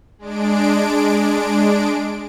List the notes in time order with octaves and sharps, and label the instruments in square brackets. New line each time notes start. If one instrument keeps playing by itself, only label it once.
[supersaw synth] G#3 D4 D7